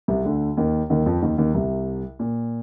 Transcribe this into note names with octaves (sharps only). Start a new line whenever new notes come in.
C2 C3
D2 D3
D#2 D#3
D#2 D#3
F2 F3
D#2 D#3
D#2 D#3
C2 C3
A#2